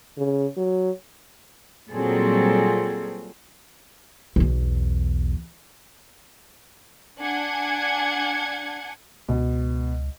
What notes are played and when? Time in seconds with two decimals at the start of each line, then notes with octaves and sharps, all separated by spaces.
0.18 C#3
0.57 F#3
1.92 A#2 F#3 G3 C4 G#4 A4
4.36 B1 E2
7.19 D4 F#5 G#5 G#6 C#7
9.29 C#2 B2